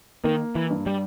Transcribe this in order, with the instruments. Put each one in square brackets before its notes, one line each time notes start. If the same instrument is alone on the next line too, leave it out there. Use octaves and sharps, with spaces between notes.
[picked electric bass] D#3 [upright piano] A#3
[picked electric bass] E3
[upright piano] G2
[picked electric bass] G3